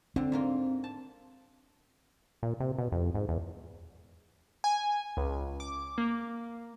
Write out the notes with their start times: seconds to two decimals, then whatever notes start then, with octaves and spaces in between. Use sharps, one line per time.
0.16 D3 C4
0.32 G#2 A#3 F4
0.84 A5
2.43 A#2
2.60 C3
2.78 B2
2.92 F2
3.14 G#2
3.29 E2
4.64 G#5
5.17 C#2
5.60 D6
5.98 A#3